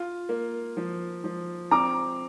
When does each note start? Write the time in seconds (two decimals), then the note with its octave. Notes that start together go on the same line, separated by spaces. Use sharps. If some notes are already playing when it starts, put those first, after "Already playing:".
Already playing: F4
0.29 A#3
0.77 F3
1.24 F3
1.71 C4 A#5 D6